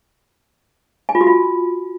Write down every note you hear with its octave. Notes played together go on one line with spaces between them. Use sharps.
G#5
F4
F#4
F4